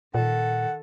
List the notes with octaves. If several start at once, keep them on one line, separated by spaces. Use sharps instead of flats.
A#2 D#3 A4 F#5